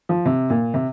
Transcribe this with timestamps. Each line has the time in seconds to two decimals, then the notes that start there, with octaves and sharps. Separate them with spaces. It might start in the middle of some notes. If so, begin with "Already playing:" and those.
0.09 F3
0.26 C3
0.50 A#2
0.74 C3